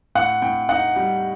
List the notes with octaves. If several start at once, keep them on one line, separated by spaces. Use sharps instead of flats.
A2 F#5
A2 G5
D#4 F#5
G3